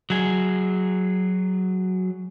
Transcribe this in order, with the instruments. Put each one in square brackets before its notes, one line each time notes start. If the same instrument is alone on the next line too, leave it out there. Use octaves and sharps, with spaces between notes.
[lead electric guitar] F#3 G#4